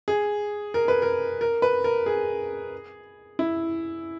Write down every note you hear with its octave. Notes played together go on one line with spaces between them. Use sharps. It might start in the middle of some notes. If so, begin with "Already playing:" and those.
G#4
A#4
B4
A#4
A#4
B4
A#4
G#4
E4